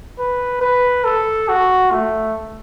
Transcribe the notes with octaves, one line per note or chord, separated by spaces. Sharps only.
B4
B4
A4
F#4
A3